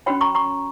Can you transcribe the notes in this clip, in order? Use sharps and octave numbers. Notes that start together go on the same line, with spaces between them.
C#4 F#4 C#5 G5 B5
A#5 C#6
A#5 C#6